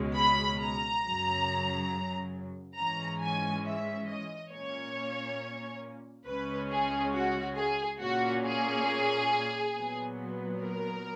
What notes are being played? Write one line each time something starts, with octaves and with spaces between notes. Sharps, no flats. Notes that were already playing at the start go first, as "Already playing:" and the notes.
Already playing: C#2 B2 G#3 C#4
B5
A#5
F#2 C#3 F#3
G#2 E3 G#3 C#4 A#5
G#5
E5
D#5
A#2 A#3 C#4 C#5
C#2 C#3 G#3 C#4 B4
G#4
F#4
G#4
A#2 A#3 C#4 F#4
G#4
A#2 F#3 B3
A#4